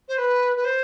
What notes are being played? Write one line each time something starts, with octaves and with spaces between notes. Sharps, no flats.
C5
B4
B4
C5